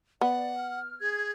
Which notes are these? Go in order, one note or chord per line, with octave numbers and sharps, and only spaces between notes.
B3 D5 F#5
F6
G#4 G#6